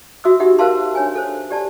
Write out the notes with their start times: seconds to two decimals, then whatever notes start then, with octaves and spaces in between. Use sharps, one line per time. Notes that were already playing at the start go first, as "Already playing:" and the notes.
0.24 F#4 E5 D#6 E6
0.40 D#4 G4 E5 F#5
0.59 A#4 C5 E5 F5 A5 C6
0.95 D4 C#5 G#5
1.15 A4 C5
1.50 G4 D5 A5